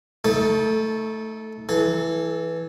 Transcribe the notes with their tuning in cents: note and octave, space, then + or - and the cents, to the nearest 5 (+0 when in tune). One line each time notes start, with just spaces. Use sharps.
A3 +0 D#4 +30 A4 -15
E3 +0 A4 -30